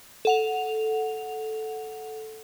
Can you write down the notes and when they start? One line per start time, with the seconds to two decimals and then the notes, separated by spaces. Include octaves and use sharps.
0.25 A4 F#5 F7